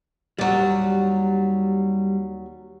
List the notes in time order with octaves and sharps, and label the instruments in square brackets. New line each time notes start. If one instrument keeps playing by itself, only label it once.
[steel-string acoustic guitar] D#2 F#3 [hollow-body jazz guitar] G3 D5